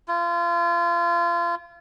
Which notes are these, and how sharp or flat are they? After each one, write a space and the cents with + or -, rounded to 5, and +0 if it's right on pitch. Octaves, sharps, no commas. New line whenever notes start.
F4 -30